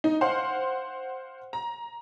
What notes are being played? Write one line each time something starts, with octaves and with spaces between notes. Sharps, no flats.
D#4
C5 F5 F#5 C6
A#5